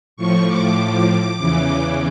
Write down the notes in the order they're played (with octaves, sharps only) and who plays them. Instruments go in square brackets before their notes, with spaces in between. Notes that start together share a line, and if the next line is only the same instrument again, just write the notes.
[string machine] A2 F3 C#6
D6
E2 C#3 E3